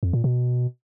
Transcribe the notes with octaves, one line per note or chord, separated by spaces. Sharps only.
F2
A#2
B2